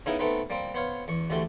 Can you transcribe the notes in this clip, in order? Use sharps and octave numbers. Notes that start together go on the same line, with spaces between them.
C#3 B3 D#4 E4 G#4 A#4
A3 B3 C4 D#4 B4
G3 A#3 C4
B3 C5 C#5 F5
E2 C#6
A1 D2 G#3 A3 F#4 G4